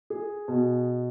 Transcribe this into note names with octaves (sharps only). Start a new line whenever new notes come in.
G#4
B2